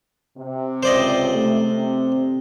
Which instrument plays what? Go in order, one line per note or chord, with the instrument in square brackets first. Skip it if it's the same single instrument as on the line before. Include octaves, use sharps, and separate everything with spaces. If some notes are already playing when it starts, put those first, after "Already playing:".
[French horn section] C3
[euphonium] C#2 [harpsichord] C5 D5 D#5
[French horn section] C3 [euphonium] A3
[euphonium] C4